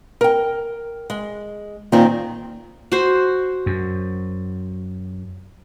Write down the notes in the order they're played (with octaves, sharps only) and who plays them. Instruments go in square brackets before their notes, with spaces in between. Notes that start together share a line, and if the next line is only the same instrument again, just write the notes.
[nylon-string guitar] A#4 G5
G#3
[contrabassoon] A#2 [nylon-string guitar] D#3 C4
[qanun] F#4 C5
[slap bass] F#2